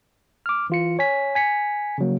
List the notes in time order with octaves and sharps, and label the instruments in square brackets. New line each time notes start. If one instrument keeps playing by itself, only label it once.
[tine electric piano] D6 F6
E3 F4 C#7
C#5 G#5 B6
G#5 B6 C#7
C#3 F3 F#3 A#3